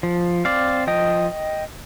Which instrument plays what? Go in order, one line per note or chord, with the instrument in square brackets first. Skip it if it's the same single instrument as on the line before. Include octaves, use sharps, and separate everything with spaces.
[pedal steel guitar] F3
C4 D5 F5
F3 D#5 G5